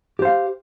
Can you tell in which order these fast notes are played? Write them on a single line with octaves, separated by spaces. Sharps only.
G4 C5 F5